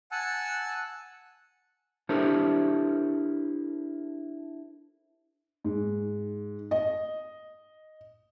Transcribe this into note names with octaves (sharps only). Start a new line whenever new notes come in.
F#5 G#5 A5 E6 F#6
D4 E4 G4 A4 A#4 C5
G#2
D#5